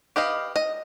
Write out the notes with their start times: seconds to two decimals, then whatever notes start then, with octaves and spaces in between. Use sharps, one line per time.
0.16 G4 B4 D#5 F5
0.56 D#5